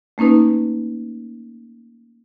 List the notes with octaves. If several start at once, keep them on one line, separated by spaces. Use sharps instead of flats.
A3 A#3 C#4 D#4 B4